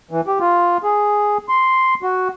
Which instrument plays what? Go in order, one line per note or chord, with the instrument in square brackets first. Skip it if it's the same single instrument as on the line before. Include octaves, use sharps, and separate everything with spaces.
[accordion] E3
G4
F4
G#4
C6
F#4